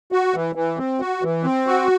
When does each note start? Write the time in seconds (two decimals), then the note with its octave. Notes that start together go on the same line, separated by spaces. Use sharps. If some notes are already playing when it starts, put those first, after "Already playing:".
0.12 F#4
0.34 E3
0.55 E3
0.78 C4
1.00 F#4
1.23 E3
1.44 C4
1.67 F#4